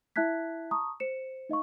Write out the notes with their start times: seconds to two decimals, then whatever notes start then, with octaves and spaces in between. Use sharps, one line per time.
0.16 E4 E5 A5 F#6 G#6 B6
0.71 A5 A#5 C#6 D#6
1.00 C5 C#7 E7
1.49 D#4 D#5 F5 C#6